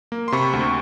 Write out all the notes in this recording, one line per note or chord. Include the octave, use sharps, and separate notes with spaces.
A#3
C6
C3 B5 C#6
D2